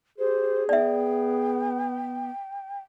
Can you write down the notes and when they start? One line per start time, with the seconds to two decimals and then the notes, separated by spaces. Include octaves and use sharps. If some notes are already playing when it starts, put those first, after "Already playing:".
0.18 G4 G#4 C5
0.69 B3 D5 E5 G5